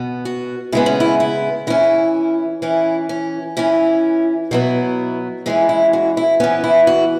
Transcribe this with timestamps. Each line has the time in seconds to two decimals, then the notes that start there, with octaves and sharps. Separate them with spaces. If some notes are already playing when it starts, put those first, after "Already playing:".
Already playing: B2 B3
0.25 F#4
0.72 C#3 G#3 B3 E4
0.86 C#4
1.00 E4
1.20 E4
1.67 E3 C#4 E4
2.62 E3 C#4 E4
3.09 C#4
3.57 E3 C#4 E4
4.51 B2 F#3 B3 E4
5.46 E3 G#3 C#4 E4
5.69 E4
5.93 F#4
6.17 E4
6.40 E3 B3 C#4
6.64 E4
6.87 F#4